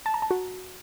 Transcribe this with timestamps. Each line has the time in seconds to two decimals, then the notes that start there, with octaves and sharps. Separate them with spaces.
0.06 A5
0.14 A#5
0.22 A5
0.31 F#4